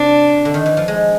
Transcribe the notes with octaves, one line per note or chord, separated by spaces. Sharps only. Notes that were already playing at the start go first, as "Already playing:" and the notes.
Already playing: C3 D4
D3
D#3
E3
F3
G#3